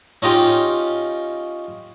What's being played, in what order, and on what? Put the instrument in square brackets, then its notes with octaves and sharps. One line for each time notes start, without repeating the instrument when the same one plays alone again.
[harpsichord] C#4 D#4 F4 G4